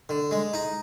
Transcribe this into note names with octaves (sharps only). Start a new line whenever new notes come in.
D3
G#3
D#4